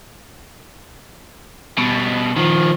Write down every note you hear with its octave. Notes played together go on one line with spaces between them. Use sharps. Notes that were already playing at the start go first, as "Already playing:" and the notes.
B2 G3
D#3 F3